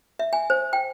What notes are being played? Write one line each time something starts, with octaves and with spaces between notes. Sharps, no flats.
E5
G#5
C5
G5